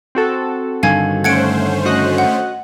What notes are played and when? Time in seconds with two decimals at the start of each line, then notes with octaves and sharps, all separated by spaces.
0.15 C4 F#4 A4
0.83 G2 D3 D#3 F5 G#5 G#6
1.24 A3 C#4 C5 F#5 G#6 C#7 D7
1.86 F#4 D#5 F#6
2.18 F#5